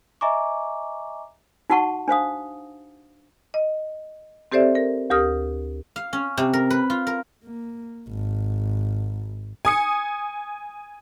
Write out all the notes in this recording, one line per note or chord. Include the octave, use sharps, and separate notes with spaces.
D#5 E5 G#5 A#5 C#6 D6
D#4 F#4 F#5 A5 C#6
D4 C5 F5 D#6
D#5
C4 G4 A4 C5 D5 E5
A#4
D2 G4 A#4 D#6 F6
F5
C#4
C3
A#4
B4
F4
A#4
A#3
G#1
G#5 D#6 C#7